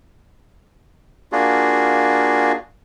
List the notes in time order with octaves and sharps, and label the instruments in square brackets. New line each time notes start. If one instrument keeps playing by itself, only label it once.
[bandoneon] A#3 D4 F4 F#4 G#4